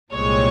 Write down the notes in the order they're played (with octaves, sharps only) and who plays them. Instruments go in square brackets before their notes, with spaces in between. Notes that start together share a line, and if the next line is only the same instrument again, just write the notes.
[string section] C2 A#2 G#3 C4 C#5